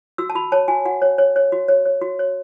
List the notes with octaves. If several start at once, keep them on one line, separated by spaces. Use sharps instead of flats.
F#4 E6
A5
F#4 B5
C#5 A5
F#4 G#5
F#4 F#5
C#5
C#5
C#5
F#4
C#5
C#5
F#4
C#5